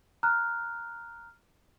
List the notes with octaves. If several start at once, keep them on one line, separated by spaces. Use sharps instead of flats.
A#5 F6 F#6